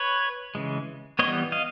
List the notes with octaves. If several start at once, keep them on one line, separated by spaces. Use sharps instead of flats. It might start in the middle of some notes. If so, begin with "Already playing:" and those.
Already playing: B4 C#5
C#3 E3 G#3
E3 G3 B3 C#5 D#5
D#5 F5